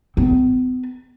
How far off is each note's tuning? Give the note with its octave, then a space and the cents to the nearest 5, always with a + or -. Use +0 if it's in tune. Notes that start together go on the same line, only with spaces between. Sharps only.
B3 +45